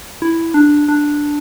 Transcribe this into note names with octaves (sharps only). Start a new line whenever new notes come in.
E4
D4
D4